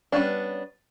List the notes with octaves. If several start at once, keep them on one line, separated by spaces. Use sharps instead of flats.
G3 B3 C#4 D4